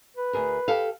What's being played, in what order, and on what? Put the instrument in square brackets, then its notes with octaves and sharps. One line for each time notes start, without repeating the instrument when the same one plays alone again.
[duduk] B4
[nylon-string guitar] D2 G#4 A#4
G4 A4 F5